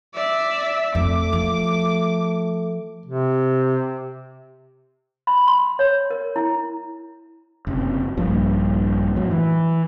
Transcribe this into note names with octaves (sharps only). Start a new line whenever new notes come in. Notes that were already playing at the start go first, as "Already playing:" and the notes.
D5 E5
F2 A3 D6
F3
C3
B5
C6
C#5
A#4
E4
F#1 C3
A#1 G2 A#2
F#2 A2 F#3
E3